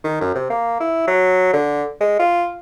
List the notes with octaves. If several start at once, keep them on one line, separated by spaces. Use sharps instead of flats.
D#3
F#2
C3
A#3
E4
F#3
D3
G#3
F4